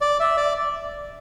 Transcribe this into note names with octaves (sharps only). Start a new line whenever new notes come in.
D5
E5
D5